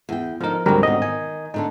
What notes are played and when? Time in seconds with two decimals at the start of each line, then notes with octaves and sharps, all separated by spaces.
0.09 E2 G5
0.41 D3 F3 D#4 A#4
0.66 D2 G#2 D3 D#3 F#3 G3 C4 A#4
0.83 B2 D#3 D#5
1.02 D#3 G#5
1.54 A2 D3 D4 D#4